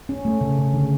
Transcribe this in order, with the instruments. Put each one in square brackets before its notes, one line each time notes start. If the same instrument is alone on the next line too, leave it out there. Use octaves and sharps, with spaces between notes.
[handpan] C#4
A3
C#3
C#3
D3